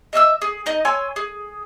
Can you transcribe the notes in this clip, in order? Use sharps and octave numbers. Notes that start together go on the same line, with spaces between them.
D#5 E5 D#6 E6
G#4
D#4 D#5
C#5 G#5 C6 E6
G#4